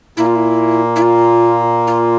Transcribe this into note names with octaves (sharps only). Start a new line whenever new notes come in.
A#2 A#3 E4
F4
E4
E4
F4
F4